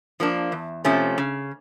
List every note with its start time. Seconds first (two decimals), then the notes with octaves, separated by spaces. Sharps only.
0.20 F3 A#3 D4
0.52 E2
0.85 C3 F3 A3 C#4
1.18 C#3